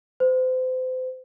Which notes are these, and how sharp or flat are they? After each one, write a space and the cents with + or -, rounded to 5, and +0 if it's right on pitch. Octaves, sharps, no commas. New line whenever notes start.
C5 -35